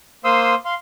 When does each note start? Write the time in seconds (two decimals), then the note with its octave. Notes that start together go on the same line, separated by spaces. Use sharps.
0.24 A#3 C5 F5 C6 D#6 E6
0.65 F5 C6